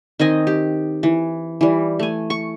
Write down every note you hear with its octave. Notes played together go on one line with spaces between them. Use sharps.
D#3 C4 D#5 G#5
G4
E3
E3 G3
A3 G#5
C#6